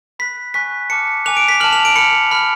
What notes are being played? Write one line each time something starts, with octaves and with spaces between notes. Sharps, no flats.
B5 F#6 B6
G#5 C#6 F#6 B6
A5 D6 F6 C#7
G#5 D6 F#6 F7
D7
B6
A5 F6 F#7
F7
D7
B5 F6 C#7
B5 F6